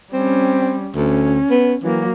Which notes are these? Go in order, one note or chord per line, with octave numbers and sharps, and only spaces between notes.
G3 C4 C#4
D2 C#4
B3
E3 F#3 A#3